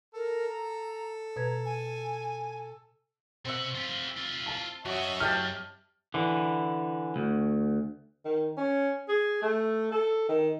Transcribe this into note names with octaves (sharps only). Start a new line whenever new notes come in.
A4 A#4
A#5
B2 B4 A#5 G#6
G#5
B2 C4 E5 F#5
F4 G4
F4 G4
A5
F#2 F#4 C#5 D#5 E5
G4 G5 A5 F6
D3 E3
D2
D#3
C#4
G#4
A3
A4
D#3